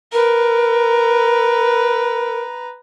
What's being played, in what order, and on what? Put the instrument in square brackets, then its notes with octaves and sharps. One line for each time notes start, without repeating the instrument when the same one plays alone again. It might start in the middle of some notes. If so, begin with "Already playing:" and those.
[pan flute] A#4 [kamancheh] B4 A#5